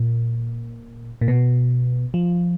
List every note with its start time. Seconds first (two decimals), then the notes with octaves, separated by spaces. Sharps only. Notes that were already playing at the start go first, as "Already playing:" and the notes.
Already playing: A#2
1.21 A#2
1.28 B2
2.14 F3